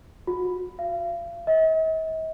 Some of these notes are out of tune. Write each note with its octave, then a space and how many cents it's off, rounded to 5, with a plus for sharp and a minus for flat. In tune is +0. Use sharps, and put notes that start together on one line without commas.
F#4 -35
F5 -40
D#5 +45